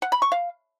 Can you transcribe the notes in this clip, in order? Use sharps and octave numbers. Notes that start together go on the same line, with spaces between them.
F#5
B5
C#6
F5